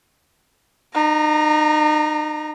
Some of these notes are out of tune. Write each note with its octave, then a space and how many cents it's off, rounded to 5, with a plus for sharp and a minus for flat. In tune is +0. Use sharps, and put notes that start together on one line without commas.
D#4 -40 A#5 +15